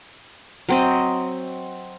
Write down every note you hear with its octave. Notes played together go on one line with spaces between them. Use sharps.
F#3 C4 D#5